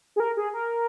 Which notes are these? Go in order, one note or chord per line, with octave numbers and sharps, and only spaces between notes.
G#4
A#4
G#4
A#4